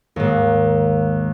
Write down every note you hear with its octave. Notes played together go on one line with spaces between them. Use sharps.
D#2 G#2